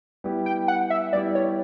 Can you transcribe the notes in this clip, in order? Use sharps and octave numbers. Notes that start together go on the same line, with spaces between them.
G3 B3 E4 G4
G5
F#5
E5
G3 B3 E4 G4 D5
C#5